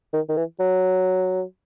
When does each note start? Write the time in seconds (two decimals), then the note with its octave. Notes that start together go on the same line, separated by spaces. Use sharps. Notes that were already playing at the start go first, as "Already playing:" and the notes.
0.13 D#3
0.29 D#3
0.37 E3
0.60 F#3